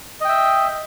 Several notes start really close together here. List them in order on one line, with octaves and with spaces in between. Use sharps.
D#5 G5 E5